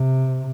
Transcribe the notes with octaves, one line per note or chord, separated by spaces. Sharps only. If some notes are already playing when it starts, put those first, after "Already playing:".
Already playing: C3